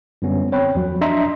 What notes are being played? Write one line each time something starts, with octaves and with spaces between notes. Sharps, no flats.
F#2 D3 G3 B3 C#4
C4 C#5 G5 B5 F#6
E2 F3 F#3
D4 D#5 E5 A#5 C6